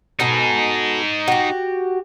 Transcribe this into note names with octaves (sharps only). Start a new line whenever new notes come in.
B2 D#4 G#4 A4 G#5
F#4 G4